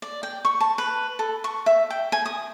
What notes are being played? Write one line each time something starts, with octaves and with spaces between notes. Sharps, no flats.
D5
G5
C#6
A5
B4
A4
C#6
E5
G5
G#5
D#6